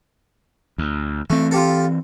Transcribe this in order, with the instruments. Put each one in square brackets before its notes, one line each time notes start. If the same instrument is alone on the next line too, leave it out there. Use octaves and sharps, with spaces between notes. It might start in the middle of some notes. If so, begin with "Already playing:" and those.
[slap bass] D2
[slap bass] E3 C4 [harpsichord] A3
[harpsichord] F4 G4 A4